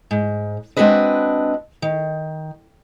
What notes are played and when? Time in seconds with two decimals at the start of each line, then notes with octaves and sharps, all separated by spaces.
0.11 G#2
0.77 G#3 C4 D4 F#4 B4 D#5
1.82 D#3